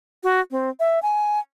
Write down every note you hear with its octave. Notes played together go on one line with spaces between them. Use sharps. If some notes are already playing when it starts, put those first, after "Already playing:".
F#4
C4
E5
G#5